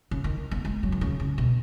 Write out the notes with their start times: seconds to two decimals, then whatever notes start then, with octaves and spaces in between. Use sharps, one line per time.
0.11 C#3
0.24 D#3
0.51 B3
0.65 G#3
0.83 F#3
0.92 D#3
1.01 C#3
1.20 C#3
1.38 B2